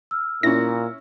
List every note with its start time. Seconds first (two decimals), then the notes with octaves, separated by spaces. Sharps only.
0.11 E6 F6
0.43 A#2 C#4 E4 A#6